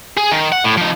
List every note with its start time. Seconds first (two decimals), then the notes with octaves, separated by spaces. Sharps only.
0.18 G#4
0.32 D#3
0.52 F#5
0.64 A2
0.77 F3 D#4